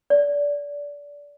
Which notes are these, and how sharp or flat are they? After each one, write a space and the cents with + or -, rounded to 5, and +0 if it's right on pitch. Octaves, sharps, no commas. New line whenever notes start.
D5 -25